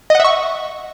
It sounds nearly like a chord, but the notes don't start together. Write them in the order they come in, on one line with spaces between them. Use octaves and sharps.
D#5 F#5 E5 C#6